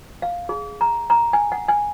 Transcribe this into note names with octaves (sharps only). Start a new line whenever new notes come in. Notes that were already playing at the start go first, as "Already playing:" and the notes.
F5
G#4
A#5
A#5
G#5
F#5
G#5